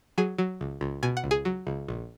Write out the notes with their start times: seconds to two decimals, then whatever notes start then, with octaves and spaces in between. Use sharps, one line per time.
0.18 F#3 G#4 G#5
0.38 F#3
0.61 C#2
0.81 C#2
1.03 B2 G#5
1.17 F#5
1.24 C#2
1.31 G#4 G#5
1.45 F#3
1.67 C#2
1.88 A#1